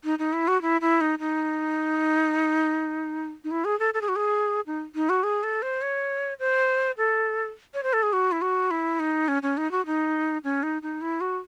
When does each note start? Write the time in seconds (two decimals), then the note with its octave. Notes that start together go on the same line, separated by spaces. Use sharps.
0.04 D#4
0.19 D#4
0.33 E4
0.48 F#4
0.62 E4
0.81 E4
1.01 D#4
1.19 D#4
3.44 D#4
3.51 E4
3.65 G#4
3.79 A4
3.94 A4
4.01 G#4
4.09 F#4
4.16 G#4
4.67 D#4
4.95 D#4
5.09 F#4
5.23 G#4
5.43 A4
5.62 C5
5.82 C#5
6.39 C5
6.98 A4
7.74 C#5
7.83 C5
7.93 A4
8.03 G#4
8.13 F#4
8.32 E4
8.42 F#4
8.71 E4
9.00 D#4
9.28 C#4
9.43 C#4
9.57 D#4
9.71 F#4
9.86 D#4
10.44 C#4
10.63 D#4
10.82 D#4
11.01 E4
11.21 F#4